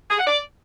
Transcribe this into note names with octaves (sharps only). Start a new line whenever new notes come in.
G#4
F#5
D5